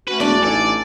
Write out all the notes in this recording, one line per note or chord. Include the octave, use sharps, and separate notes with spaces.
A3 C#4 F#4 B4
E1 D4 D5 D6
A1 D#4 A4 D5 G#5